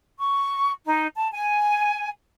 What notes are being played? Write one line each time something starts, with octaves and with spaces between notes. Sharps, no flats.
C#6
D#4
A5
G#5